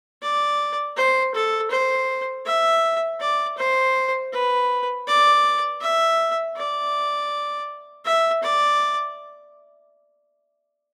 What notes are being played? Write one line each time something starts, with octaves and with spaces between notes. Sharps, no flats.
D5
C5
A4
C5
E5
D5
C5
B4
D5
E5
D5
E5
D5